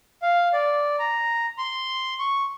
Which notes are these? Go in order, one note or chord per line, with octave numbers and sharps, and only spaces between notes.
F5
D5
A#5
C6
C#6